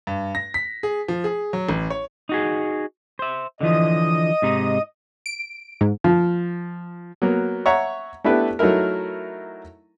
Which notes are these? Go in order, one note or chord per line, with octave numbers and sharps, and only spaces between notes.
G2
A#6
B6
G#4
F3
G#4
F#3
A1
C#5
D#4 F#4 G#4
C5 E5
D3 E3 F3 D#5
G#2 C3 D#4
D7
G#2
F3
F#3 A#3 B3
C#5 E5 F#5 A#5 C#6
A3 B3 D4 E4 G4 B4
F#3 A3 D#4 E4 A#4